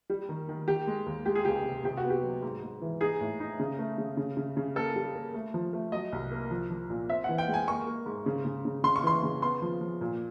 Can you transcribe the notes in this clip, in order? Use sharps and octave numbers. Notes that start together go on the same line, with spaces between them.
G3
D#3
D#3
D#3 G4
G#3
D#2
G#3 G4
G#4
C#2 G4
C3
C3 G4
F#4
B3
G4
F#3
G#2
G#2
E3
D#4 G#4
A2
D#4
C#3
A3
C#3
C#3
C#3
C#3
A#3 A4
G3
A#3
A3
F3
A3
F#3 D#5
C2
A#3
F3
F3
A#2
C4 E5
F#5
E3
G5
G#3
G#5
A#3 C#6
A#3
G#2
C#3
C#3
C#3
C#3 C6
C#6
E3 C6
C#3
B3 C6
F3
F3
A#2